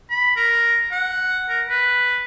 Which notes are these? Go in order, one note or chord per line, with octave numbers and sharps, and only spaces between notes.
B5
A#4
F#5
A#4
B4